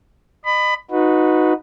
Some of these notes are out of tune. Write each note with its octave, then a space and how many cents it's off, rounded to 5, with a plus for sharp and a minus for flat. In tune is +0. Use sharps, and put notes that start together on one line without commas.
D#5 -30 B5 +20
D#4 +0 F#4 -25 B4 +0